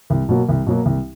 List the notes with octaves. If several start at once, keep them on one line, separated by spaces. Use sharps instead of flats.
C2
B2 F#3 A#3
C2
B2 F#3 A#3
C2